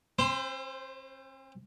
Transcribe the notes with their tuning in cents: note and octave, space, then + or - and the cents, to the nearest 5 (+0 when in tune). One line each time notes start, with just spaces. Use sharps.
C4 +45 C5 +0 C6 -45